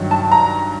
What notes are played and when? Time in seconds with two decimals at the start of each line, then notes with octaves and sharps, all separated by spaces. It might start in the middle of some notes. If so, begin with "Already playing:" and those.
Already playing: G2 D#3 F#3
0.11 A5
0.32 A#5